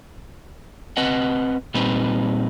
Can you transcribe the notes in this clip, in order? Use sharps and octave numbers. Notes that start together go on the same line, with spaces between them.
C4 B4 D#5 F#5
A#2 G3 C4 D#4 B4